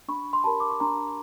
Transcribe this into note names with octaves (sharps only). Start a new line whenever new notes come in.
D4 B5 C#6
C6
G4 A#4 A5 B5
D6
C#6
D4 A#5 C6